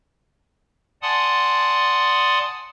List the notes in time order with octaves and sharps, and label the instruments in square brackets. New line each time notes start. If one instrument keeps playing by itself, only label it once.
[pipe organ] D5 F#5 G#5 A5 C6 D#6